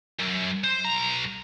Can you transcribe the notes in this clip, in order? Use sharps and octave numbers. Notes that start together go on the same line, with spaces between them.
F#2
C5
B1 A#5